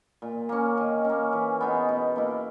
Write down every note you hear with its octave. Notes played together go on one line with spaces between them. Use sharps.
A#2
A#3 C#4
D#3
A#3 C#4
E3
B3 D#4 G#4
B2
A#3 E4